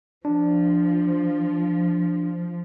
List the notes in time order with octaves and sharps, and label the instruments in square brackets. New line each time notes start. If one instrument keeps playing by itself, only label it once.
[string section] F3 [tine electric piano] D4